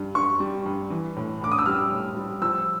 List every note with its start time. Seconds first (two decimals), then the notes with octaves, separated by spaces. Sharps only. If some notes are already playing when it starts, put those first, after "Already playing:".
Already playing: G2 G3
0.15 G2 C#6
0.40 G3
0.66 G2
0.90 E3
1.16 A2
1.41 A2 D6
1.52 D#6
1.58 E6
1.66 G3 F6
1.92 A2
2.17 G3
2.42 F3 E6